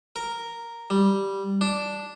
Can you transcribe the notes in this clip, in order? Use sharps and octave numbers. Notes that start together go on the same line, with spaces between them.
A#4
G3
D4